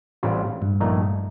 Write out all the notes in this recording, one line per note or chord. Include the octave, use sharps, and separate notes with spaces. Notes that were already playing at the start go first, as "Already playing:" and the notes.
A1 A2 G3 C4 F4
G2
A#1 A#2 A3 D#4